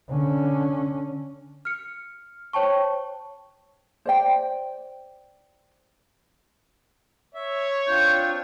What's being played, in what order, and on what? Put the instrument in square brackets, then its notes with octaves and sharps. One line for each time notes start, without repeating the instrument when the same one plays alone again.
[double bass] D3 C#4
[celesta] F6 C#7
C5 C#5 G5 A5 C#6
[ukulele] C5 D5 G5
[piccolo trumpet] C#5 [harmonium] E5
[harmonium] C4 D4 F4 [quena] G6